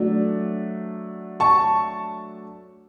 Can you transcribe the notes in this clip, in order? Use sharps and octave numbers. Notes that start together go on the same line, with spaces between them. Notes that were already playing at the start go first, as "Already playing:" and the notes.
Already playing: F#3 A3 D4
A5 C#6